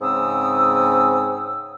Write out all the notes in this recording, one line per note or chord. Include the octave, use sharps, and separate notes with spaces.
G#2 C#3 C4 D#6 E6